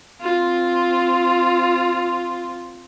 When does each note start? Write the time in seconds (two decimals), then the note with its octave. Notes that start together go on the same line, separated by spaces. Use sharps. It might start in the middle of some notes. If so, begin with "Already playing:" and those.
0.21 C4 F4